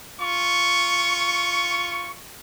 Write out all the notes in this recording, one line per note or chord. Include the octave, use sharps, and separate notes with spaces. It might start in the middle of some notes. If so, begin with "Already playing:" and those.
F4 C#6